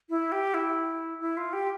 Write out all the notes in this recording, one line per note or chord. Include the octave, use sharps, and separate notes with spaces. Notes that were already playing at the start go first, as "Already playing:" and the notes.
E4
G4
E4
E4
F4
G4